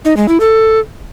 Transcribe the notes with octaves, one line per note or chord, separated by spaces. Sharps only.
D#4
G#3
E4
A4